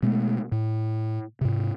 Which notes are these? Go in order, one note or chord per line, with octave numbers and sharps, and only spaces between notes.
B2 G#3 A3 B3
A2
G#2 C3